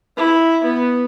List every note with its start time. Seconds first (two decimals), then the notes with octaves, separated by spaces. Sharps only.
0.17 E4
0.64 B3